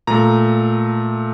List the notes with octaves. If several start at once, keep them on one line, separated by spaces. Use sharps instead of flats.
A#2 A3 A#5